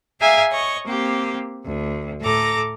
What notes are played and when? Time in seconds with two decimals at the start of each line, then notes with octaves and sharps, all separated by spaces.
0.21 G#4 E5 F5 G#5 A#5 D6
0.52 C#5 D#5 C#6
0.87 A#3 C4 G4
1.64 D2
2.22 A2 A4 A#5 D6 A#6